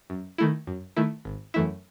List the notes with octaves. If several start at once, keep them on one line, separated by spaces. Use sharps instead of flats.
F#2
D#3 A3 E4
F#2
D#3 A3 E4
G#1
F#2 E3 A3 E4